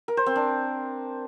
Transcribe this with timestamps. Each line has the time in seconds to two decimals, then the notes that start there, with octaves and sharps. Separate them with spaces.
0.08 A#4
0.17 C5
0.26 C4
0.36 D4